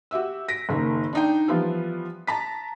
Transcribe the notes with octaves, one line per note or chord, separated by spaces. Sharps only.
F#4 G4 E5 E6
A#6 B6 D7
F#1 D#3 A#3
D4 D#4 G5
E3 F3 G3 B3 F4
A5 A#5 B6